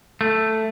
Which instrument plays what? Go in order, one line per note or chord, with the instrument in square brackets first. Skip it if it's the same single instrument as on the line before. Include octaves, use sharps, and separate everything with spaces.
[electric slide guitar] A3